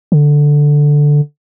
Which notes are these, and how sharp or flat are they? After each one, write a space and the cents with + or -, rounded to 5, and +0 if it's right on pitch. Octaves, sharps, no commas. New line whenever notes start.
D3 +0